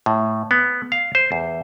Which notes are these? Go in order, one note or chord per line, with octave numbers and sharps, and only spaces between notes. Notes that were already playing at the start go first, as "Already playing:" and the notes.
A2
B3
F5
C5
E2